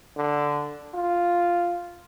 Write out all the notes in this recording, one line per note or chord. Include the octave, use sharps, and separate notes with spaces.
D3
F4